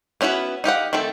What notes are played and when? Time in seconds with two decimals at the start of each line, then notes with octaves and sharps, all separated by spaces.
0.21 B3 C#4 E4 F#4 B4
0.64 D#4 G4 F5 F#5
0.93 D#3 A3 C4 A4